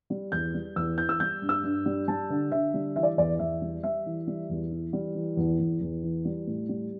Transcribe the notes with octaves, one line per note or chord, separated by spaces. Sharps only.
G3
E2 G6
G3
E2 E6
E3 G6
E6
G3 G6
G2
E6
G2
G3
G3 A5
D3
D3 E5
G3
E3 E5
D5
E2 D5
E2 E5
G3
G3 E5
E3
G3
E2
E3
G3
E3
E2
E2
E2
E3
G3
A2
G3